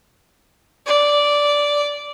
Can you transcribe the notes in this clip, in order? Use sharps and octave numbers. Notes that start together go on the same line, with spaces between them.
D5